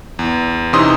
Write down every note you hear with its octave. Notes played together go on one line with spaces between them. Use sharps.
E2
C3 E3 C#4 D#4 C6 D#6